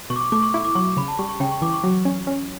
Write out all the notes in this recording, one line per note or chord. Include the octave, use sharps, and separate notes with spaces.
B2 C#6
D6
C#6
A3 D6
C#6
E4 C#6
D6
F#3 C#6
C#3 B5
A5
G3 C#6
C#6
C#3 G5
C#6
E3 D6
C#6
F#3
C#4
C#4